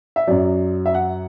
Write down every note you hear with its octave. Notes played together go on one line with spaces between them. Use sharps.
E5
F#2 F#3 D5
E5
F#5